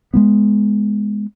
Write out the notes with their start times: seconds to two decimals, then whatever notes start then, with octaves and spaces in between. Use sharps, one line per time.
0.14 G#3 A#3 B3